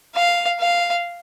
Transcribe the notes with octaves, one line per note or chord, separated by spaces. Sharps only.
F5
F5